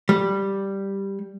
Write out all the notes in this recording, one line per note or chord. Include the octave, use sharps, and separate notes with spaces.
G3